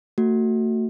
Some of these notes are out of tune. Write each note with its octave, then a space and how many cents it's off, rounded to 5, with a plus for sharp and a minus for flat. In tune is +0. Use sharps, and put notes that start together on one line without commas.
A3 +35 F#4 +0